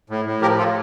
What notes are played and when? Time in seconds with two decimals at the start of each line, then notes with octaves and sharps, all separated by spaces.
0.10 A2
0.25 A2
0.41 F3 G4 A#4
0.58 A2 F4 A4